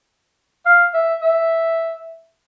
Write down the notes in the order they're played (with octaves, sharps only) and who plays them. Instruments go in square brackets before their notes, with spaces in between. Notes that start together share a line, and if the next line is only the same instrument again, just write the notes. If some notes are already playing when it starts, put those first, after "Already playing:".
[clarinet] F5
E5
E5